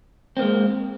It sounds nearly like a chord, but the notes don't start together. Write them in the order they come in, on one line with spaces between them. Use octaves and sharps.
C4 A#3 G#3